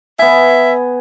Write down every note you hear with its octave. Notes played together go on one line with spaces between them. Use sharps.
B3 E5 G#5